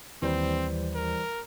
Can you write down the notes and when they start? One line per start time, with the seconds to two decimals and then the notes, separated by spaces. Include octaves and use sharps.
0.22 D#2 E3 G3 C4 C5
0.95 A#4